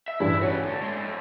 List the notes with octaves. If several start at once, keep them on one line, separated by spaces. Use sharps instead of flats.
E5
A1 G2 E3 E4
F#4 G#4 C#5
D3 A3
A#2 G#3
F2